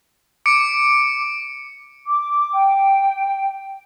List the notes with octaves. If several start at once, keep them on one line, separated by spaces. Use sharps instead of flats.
D6 C#7 D7
D6
G5